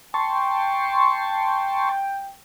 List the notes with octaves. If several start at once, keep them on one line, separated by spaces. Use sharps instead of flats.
G5 A5 C6 C#6